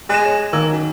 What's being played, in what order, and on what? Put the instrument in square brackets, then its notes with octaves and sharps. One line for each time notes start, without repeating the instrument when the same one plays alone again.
[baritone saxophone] G#3 [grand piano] F#6 E7
[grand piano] C#5
[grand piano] D#3 E6 G#6 [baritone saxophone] A#3
[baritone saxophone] F#2